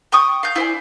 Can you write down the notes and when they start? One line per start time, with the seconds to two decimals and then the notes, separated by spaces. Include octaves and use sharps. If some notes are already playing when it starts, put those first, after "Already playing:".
0.12 G5 C#6 D#6
0.43 F5 G6
0.56 E4 C5 D5 G#5